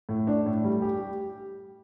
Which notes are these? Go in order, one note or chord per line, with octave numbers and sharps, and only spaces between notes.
A2
D4
A2
G3
G4